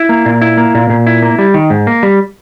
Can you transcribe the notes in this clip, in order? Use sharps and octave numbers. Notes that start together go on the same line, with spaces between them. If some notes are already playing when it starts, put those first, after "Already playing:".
Already playing: E4
A#3
A#2
E4
A#3
A#2
A#2
E4
A#3
G3
D#3
G#2
A#3
G3